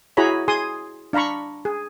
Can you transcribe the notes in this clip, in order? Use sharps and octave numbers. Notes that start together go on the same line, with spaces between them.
E4 F#4 G#4 C#5 A#5 B5
G#4 G#5 C6 D#6
D4 F5 A#5 B5 C#6
G#4